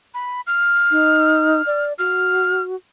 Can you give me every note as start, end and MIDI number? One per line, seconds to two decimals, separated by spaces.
0.14 0.41 83
0.47 1.84 89
0.91 1.62 63
1.67 1.93 74
1.99 2.76 66
1.99 2.62 89